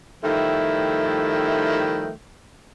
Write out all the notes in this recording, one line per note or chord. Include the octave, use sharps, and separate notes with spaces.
D#3 F3 G3 A3 E4 G5